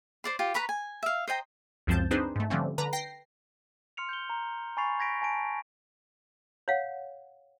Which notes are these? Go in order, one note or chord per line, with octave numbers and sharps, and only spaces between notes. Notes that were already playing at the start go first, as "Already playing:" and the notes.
C5 D5 C6
F4 G4
B4 A#5 B5 C#6
G#5
E5 F5
C5 D#5 G5 A#5
C#2 F#2 F3 C4 A5 G6
C4 D4 D#4 G#4 B4 C5
G#2 A3
D3 F3 G3 A3 C4 C#4
D3 B4 A#5
G5 A#6 C7
C6 F6 C#7 F7
G6 C#7 G7
A#5
G#5 B5 C#6 A6 C7 F7
G6 G#6 A#6 B6 D7
G#5 A5 D7
C#5 F5 F#5